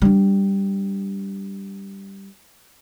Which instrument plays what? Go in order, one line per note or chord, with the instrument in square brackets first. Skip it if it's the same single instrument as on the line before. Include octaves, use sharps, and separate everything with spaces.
[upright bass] G3 D4